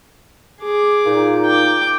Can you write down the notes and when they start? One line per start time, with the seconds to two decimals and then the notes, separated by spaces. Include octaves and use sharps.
0.60 G#4 D6
1.05 A#2 D#4
1.45 G5 D6